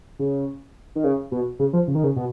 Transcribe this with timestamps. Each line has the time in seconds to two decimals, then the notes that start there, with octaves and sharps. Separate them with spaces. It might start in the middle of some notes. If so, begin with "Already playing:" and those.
0.19 C#3
0.96 D#3
1.04 C#3
1.32 B2
1.59 C#3
1.73 F3
1.88 C#3
1.95 D#3
2.04 C#3
2.16 B2